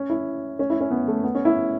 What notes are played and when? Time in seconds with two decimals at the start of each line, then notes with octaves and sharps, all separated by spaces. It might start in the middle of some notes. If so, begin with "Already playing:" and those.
Already playing: C#4
0.10 E4
0.59 C#4
0.70 E4
0.80 C#4
0.91 B3
1.08 A3
1.24 B3
1.35 C#4
1.45 E4